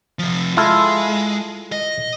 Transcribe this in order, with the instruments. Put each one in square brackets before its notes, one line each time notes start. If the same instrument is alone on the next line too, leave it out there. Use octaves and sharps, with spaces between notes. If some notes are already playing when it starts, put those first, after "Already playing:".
[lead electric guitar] C3 F3
[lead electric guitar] G#3 [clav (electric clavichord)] E4 F4 A4
[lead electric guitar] D#5